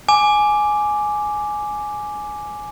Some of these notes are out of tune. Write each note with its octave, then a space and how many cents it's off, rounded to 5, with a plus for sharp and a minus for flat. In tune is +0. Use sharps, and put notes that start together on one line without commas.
G#5 +10 D6 +0